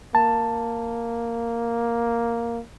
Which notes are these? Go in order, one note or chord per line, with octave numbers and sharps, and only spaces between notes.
A#3 A5